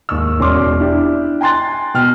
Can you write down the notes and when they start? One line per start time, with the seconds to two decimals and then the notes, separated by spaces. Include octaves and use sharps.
0.09 D#2 G#2 C#6 E6
0.39 E1 C#4 C6 D6 F6
0.80 D4 E4 G4
1.41 G5 G#5 A#5 C6 F#6 A6
1.94 B2 G5 F6